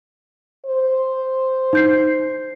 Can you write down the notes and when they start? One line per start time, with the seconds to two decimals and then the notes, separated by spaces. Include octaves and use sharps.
0.66 C5
1.73 D#4 G6 C7